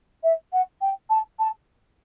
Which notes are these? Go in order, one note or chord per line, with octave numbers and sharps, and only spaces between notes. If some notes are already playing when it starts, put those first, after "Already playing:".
E5
F#5
G5
A5
A5